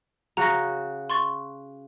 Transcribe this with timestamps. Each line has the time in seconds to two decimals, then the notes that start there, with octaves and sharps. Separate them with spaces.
0.37 C#3 F#4 A#5 A#6
1.10 C6 C#6 A6